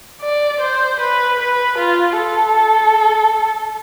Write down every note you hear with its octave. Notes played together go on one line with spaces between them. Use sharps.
D5
C5
B4
B4
F4
A4